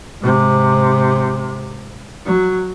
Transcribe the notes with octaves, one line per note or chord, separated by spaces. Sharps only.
G#2 C3
F#3